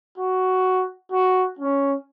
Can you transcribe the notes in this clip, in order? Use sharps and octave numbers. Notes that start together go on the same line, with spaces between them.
F#4
F#4
C#4